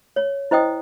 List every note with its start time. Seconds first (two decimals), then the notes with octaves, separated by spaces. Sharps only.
0.16 C#5
0.51 E4 C5 D#5 G5 D#6